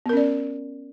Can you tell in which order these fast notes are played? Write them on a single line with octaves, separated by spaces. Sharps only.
B3 A#4 C#4 D5